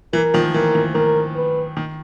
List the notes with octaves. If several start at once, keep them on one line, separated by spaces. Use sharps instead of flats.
E3 A#4
D#3 F3
E3 A#4
D#3
D#3 A#4
B4
D#3